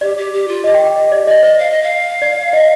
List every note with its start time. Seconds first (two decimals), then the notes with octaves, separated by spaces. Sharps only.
0.01 G4 D5
0.17 G4
0.33 G4
0.48 F4
0.64 G4 D#5
0.74 G5
0.85 G5
0.96 D#5
1.12 D5
1.27 D5 D#5
1.43 C5 D#5
1.59 F5
1.70 D#5
1.83 F5
2.22 D5
2.53 D#5